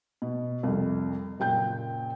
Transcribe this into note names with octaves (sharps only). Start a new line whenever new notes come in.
B2
C2 F2
F#1 A#2 G5 G6